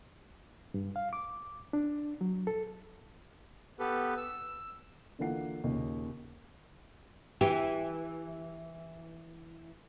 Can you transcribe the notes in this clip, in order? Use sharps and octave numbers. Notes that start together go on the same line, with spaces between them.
G2
F5
D6
D4
F#3
A4
B3 G4 A4 B4
E6
D3 E3 A#3 F4 F#5 C7
D#2 A#2 C#3
E3 G4